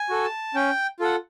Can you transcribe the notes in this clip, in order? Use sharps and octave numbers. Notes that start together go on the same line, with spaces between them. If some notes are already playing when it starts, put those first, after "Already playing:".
Already playing: G#5
F#4 A4
A5
C#4 G5
F4 A4 F#5